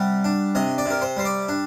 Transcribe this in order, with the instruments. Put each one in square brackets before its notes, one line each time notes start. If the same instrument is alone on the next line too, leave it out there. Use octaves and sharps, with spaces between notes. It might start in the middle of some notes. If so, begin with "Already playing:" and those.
Already playing: [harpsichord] C3 G3 F#5
D4
C3 D#5
D5
C3 A#4
C5
G3 C5
D5
D4